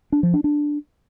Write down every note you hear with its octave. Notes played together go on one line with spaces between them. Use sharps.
D4
F3
D4
D4